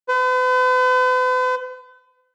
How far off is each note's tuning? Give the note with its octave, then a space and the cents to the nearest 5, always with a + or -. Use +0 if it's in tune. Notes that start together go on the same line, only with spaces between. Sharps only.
B4 +45